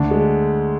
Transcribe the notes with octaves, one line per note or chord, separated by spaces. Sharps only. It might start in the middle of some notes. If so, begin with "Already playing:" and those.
Already playing: D2 D4
G#3